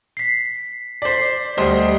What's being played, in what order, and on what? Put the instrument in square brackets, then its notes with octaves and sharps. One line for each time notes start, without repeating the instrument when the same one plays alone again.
[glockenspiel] B6 C7
[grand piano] C5 D5 [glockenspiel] B6 C7
[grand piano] D2 C5 D#5 [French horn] G3